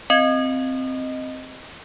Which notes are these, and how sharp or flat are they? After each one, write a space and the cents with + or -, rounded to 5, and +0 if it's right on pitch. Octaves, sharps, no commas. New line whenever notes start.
C4 -5 D#5 +0